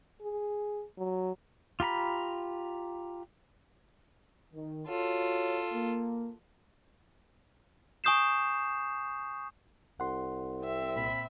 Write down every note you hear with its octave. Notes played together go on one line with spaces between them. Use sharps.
G#4
F#3
F4 G4 A#5 B5
D#3
F4 F#4 A4 C#5
A#3
G#5 C#6 D#6 G6 C7 E7
C2 F#5 C6
C4 E5
A#2 B5